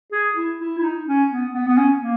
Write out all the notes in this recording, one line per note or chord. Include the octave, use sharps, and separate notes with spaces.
G#4
E4
E4
E4
D#4
C#4
B3
B3
B3
C#4
A#3